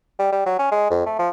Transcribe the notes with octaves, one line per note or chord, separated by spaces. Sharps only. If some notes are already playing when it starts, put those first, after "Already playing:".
G3
G3
F#3
C#4
G#3
F2
A3
F3